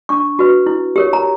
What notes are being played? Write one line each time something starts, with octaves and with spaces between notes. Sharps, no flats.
D4 C#6
F#4 B4
E4
G4 A#4 C#5
A#5